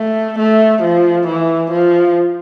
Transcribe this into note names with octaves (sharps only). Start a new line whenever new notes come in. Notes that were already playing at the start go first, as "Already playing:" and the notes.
Already playing: A3
A3
F3
E3
F3